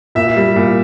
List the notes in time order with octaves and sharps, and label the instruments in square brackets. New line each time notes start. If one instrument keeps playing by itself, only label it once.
[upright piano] A#2 [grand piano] E5
[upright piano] G3
A#2